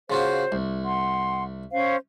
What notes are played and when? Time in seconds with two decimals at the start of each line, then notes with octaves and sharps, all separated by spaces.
0.10 C#3 F4 F#4 C5
0.52 C2
0.83 F#5 C6
1.72 C#4 C5 F5